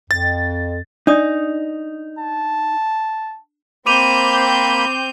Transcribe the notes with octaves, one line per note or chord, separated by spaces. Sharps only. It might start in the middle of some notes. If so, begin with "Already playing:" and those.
F2 A6
D4 D#4 D5 D#6
A5
A#3 C4 B5 D6 G6 D#7 F7